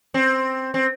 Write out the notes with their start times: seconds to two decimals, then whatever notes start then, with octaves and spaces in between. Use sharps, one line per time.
0.14 C4
0.74 C4